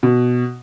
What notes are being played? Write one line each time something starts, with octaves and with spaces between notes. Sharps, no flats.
B2